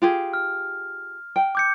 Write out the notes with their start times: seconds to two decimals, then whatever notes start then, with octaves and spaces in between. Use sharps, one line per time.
0.02 F4 G4 G#4
0.34 F6
1.36 G5
1.55 D6 G6 C#7